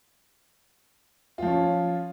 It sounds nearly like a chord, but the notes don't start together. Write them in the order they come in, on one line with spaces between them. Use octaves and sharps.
F4 F3 C#4